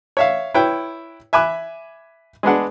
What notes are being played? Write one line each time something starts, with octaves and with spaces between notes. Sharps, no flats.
C#5 E5 F5
E4 B4 C#5 G5
E5 G#5 B5 D6 F#6
G#3 B3 D4 F#5